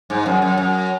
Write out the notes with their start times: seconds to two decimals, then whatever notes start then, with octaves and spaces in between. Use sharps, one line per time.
0.10 G#2
0.26 F#2
0.42 F#2
0.57 F#2